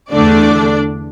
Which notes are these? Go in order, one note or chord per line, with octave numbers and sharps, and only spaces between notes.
E2 D3 A3 D4 D5